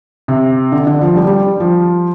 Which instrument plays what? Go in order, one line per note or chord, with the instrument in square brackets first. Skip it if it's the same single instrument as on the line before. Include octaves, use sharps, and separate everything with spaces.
[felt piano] C3
D3
D3
F3
G3
G3
F3